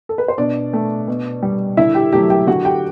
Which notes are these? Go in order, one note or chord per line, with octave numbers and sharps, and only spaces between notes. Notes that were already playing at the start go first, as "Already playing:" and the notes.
A4
B4
C5
B2 D4 D5
A3
B2
G3
D3 E4 E5
G4 G5
F#3 A3 G4 G5
G4 G5
D3 F#4 F#5
G4 G5